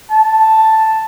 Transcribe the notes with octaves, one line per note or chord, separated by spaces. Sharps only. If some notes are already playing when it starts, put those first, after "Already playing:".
A5